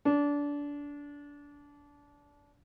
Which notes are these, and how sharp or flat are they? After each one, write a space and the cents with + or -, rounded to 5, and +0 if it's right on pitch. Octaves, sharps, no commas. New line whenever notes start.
D4 -25